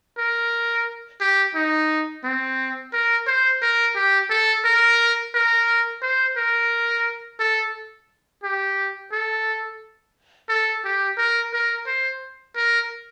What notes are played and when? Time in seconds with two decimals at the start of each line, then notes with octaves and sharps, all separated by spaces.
0.18 A#4
1.20 G4
1.55 D#4
2.24 C4
2.93 A#4
3.27 C5
3.62 A#4
3.96 G4
4.30 A4
4.64 A#4
5.34 A#4
6.02 C5
6.37 A#4
7.39 A4
8.43 G4
9.12 A4
10.49 A4
10.84 G4
11.17 A#4
11.53 A#4
11.87 C5
12.56 A#4